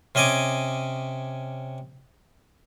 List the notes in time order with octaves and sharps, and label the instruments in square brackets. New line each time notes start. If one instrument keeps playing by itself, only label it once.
[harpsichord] C3 C#4 D#5 G#5 D6